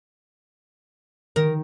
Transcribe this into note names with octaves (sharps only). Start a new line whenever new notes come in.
D#3 A#4